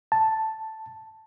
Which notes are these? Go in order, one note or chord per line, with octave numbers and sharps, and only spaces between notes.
A5